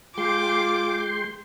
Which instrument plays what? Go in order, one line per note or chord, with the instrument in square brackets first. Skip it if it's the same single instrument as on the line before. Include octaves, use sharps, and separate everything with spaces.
[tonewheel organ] G#3 G5 C6 [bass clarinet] F4 [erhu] D6